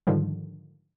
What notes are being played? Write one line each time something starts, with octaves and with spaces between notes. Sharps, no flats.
G#2 D3 D#3 F3 G3